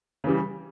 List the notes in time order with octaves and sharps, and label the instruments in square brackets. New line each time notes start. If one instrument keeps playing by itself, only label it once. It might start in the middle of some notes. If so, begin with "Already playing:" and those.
[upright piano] C#3 E3 G3